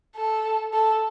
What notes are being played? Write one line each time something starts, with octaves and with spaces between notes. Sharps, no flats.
A4
A4